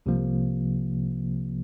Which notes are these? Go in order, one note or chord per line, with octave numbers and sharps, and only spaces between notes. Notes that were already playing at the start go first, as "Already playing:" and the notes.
C2 C3 F3 A#3